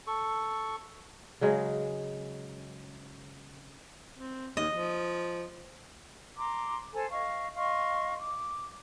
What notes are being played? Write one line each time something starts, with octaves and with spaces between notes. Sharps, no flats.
A4 C#6
C#3 F#3 G#3
C4
D#2 D#5
F3
A#5 C6 D6
A4 C5 G#5
D#5 F5 C#6
D#5 F5 C6 C#6
D6